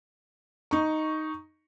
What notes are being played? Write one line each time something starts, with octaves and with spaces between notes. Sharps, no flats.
D#4 C#6